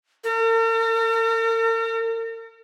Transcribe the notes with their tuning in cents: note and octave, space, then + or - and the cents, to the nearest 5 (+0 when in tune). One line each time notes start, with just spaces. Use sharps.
A#4 -45